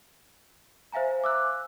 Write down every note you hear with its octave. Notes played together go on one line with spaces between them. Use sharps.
C5 E5 F5 G#5 A#5
D6 E6 F#6